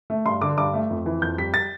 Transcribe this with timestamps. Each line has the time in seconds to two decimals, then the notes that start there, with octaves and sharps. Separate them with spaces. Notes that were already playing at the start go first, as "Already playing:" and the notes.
0.10 A3
0.26 G2 C6
0.41 D3 D6
0.58 G2 D6
0.74 A3
0.90 F2
1.06 E3
1.22 F2 G6
1.38 G3 B6
1.54 A6